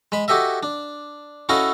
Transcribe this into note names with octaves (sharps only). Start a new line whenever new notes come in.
G#3 B5
F#4 G4 A4 D#5 E5
D4
C#4 E4 F#4 A4 D#5 F5